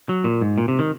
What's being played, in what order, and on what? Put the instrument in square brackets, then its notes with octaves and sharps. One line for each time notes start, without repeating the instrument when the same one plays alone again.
[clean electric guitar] F#3
A#2
G#2
A#2
C3
D#3